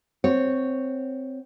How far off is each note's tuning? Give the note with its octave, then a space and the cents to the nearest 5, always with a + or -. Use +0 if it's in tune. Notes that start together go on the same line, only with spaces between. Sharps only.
C4 +0 C#5 +0 F#5 +0